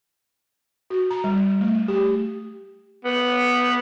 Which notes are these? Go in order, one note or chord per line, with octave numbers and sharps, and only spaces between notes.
F#4
A#5
G3
A3
G4
B3